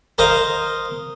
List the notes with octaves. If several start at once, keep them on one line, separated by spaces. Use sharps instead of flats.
A#4 C5 D#5 F5